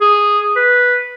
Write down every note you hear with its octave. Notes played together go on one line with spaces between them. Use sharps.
G#4
B4